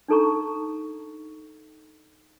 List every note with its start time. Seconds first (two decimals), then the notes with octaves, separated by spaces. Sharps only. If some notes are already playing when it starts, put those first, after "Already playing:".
0.08 D4 D#4 A4 A#5 C#6